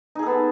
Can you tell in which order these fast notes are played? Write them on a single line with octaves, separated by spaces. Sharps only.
D#4 G#4 A4 B3